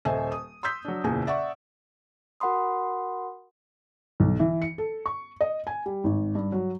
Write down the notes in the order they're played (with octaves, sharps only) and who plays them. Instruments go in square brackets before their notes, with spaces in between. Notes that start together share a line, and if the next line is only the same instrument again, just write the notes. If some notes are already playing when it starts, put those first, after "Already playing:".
[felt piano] D#1 A4 C5 D#5 E5 G#5
D#6
C6 D#6 E6 G6 B6
F#3 D4
F#1 E2 A#2 G#5
D5 E5 F#5 C#6
[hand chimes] F#4 A#4 F#5 B5 C6 D#6
[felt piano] B1
E3
C#7
A4
C#6
D#5
G#5
G3
G#1
G2
F#3